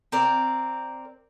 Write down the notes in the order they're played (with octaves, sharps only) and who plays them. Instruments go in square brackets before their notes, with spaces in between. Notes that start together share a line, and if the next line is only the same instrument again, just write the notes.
[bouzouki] C4 A#4 D5